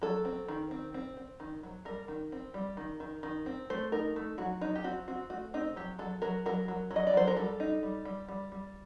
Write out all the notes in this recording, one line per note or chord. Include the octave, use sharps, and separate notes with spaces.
F#3 A4
C4
D#3
C4
C4
C4
D#3
F#3
G3 A#4
D#3
C4
G3
D#3
D#3
D#3
C4
A3 C5
D#4 A#4
A3
F#3 F#4
F#3 D#4
G4
C4 F#4
C4 F#4
A3 F#4
C4 D#4
F#3 G4
F#3 A4
F#3 A#4
F#3 A#4
F#3
F#3
D#5
D5
F#3 C5
A#4
G3 A4
D#4
G3
G3
G3
G3